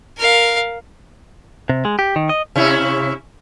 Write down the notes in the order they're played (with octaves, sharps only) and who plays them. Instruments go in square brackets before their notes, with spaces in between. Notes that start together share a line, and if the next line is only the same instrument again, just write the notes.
[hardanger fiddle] A#4 F5
[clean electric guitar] C3
G#3
G4
D#3
D#5
[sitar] C3 C#4 E4